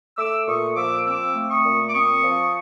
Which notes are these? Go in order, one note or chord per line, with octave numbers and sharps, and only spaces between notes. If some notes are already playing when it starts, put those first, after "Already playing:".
A3 D6 E6
A#2 C#6 D#6
F3 D6 E6
C4 D6 E6
A3
C#6 D#6
A#2
D6
C4 C#6 D#6
F3